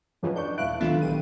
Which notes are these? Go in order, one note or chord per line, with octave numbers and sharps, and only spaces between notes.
C#2 F#2 E3 F3
D4 D5 C#6 G6
D#1 E4 F5 F#6 D7
D3 D#3 F#3 B3 F4 B5 E7
A#1 G2 D#7